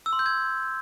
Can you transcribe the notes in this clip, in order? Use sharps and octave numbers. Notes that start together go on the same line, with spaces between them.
E6
C6
G6
G#6